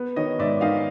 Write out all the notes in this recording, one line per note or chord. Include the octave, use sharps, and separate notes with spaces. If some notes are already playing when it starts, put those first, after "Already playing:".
Already playing: B3
D#3 C#5 D#5
G#2 D5 E5
D#3 D#5 F5